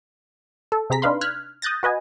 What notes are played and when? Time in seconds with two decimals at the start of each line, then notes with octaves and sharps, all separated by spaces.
0.72 A4
0.90 C3 C4 G#4 A#5 B6
1.02 D4 D#4 B4 F5 B5 C6
1.21 F6 F#6 G#6 B6
1.62 D#6 F#6 G6 A6 A#6
1.83 F#4 B4 D#5 G#5